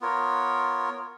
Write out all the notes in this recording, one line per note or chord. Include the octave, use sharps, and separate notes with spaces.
B3 F4 A#4 C#5